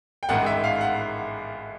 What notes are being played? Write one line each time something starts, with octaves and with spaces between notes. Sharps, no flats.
G5
A1 G#2 D#3 F#5
E5
F5
F#5